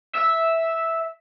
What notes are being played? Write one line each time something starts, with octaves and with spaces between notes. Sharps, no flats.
E5